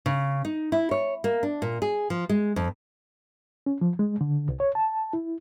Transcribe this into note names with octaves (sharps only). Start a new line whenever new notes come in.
C#3
D#4
E4
C#5
A#3
D4
A#2
G#4
F3
G#3
F2
C#4
F3
G#3
D3
C2
C#5
A5
E4